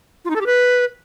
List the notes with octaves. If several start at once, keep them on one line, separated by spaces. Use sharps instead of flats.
F4
D#4
A4
G4
B4